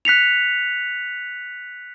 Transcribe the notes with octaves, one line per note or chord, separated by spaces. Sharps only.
F#6 B6 C#7 F7